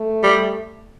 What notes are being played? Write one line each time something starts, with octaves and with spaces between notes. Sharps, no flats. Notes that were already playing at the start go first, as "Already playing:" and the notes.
Already playing: A3
G3